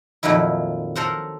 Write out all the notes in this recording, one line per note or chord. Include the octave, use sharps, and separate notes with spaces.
F2 A#2 D#3 F#3 E4
A4 A#4 C5 F#5